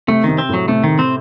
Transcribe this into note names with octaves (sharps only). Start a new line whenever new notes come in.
C3 A3
C3 D#3
C4
A2 F#3
C3 A3
D#3
C4